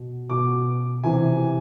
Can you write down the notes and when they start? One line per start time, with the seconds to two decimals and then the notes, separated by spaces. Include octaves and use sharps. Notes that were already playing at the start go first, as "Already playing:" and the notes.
Already playing: B2
0.30 B2 D6
1.04 C3 E3 G#5